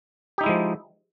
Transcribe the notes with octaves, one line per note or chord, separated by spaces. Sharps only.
F3 G#3 D#4 E4 G4